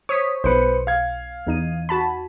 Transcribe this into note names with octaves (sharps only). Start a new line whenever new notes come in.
C5 C#5 D#6 B6
B1 B4 C5 C#7
F5 G#6
E2 D#4 D#7
F#4 A5 B5